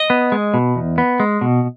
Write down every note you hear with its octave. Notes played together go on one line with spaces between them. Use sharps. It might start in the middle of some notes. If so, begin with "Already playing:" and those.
Already playing: D#5
B3
G#3
B2
E2
B3
G#3
B2